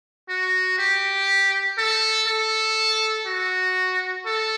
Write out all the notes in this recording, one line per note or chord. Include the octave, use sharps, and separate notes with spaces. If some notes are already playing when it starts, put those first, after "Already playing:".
F#4
G4
A4
A4
F#4
A4